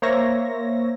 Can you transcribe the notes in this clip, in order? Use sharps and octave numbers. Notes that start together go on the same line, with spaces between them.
A#3 C5 C#5 E5 A#6